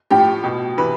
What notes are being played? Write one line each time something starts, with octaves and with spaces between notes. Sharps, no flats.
A2 F3 G4
B2
C3 E3 B4